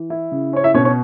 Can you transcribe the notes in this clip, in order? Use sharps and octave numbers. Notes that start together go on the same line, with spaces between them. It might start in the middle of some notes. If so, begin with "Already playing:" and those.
Already playing: E3
E4
C#3
C#4 C#5
E4 E5
B2 C#4 C#5
C#4 C#5